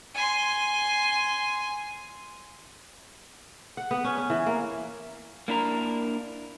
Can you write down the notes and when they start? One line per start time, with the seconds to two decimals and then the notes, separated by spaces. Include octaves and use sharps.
0.15 G#5 C6
3.77 F#5
3.91 B3
4.04 C#4
4.18 C#4
4.30 E3
4.46 A#3
5.48 A#3 D4 E4 A#4